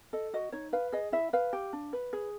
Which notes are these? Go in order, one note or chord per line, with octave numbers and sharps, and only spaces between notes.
A4 D#5
F#4 D#5
D#4 C#5
B4 F5
G#4 D#5
E4 E5
B4 F5
G4
D4
B4
G#4